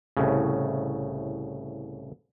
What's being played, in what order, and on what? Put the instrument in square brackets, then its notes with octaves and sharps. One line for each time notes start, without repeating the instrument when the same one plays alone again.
[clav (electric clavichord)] C2 A2 C#3